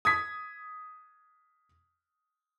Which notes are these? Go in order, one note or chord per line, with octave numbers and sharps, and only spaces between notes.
D#6 G#6 B6